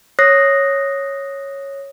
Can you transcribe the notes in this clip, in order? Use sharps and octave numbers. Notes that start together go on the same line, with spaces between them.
C#5 D#6 F#6 A#6 C7